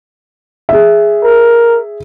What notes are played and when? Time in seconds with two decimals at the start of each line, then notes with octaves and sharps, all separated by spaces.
0.69 G#4 E5
1.24 A#4